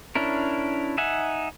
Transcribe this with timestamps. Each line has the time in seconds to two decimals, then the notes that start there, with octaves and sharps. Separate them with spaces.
0.15 C#4 D4 E4 A#4
0.98 D#4 E5 F#5 G#5